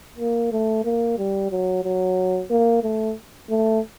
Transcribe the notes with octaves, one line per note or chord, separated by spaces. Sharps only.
A#3
A3
A#3
G3
F#3
F#3
A#3
A3
A3